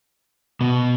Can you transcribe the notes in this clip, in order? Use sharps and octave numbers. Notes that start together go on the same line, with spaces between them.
B2